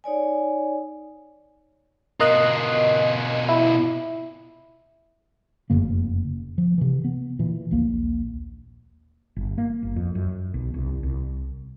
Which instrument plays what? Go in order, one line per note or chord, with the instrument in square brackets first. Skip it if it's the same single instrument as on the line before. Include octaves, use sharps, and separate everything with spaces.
[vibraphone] D#4 C#5 D5 G#5
[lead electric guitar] B2 F4 [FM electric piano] A#4 D#5 F#6
[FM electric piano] E4
[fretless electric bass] F1 F#2 C#3 A#3
F3
C3 E3
B3
A#2 E3
A#1 D#2 A#3
G1
A#3
G1
F2
F#2
B1
C2
C2